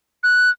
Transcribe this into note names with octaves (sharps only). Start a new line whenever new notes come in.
F#6